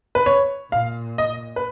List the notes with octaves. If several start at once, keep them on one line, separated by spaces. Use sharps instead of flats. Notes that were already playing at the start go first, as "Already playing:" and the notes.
B4
C#5
A#2 F5
D#5
B4